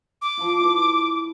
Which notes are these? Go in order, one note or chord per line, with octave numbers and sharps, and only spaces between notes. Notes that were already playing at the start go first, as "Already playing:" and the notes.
D6
F3 F4
E4 B4